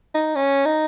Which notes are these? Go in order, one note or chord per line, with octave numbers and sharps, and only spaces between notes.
D#4
C#4
D#4